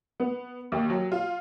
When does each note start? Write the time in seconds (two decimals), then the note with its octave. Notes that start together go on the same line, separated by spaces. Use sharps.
0.20 B3
0.72 D#2
0.90 F#3
1.12 F4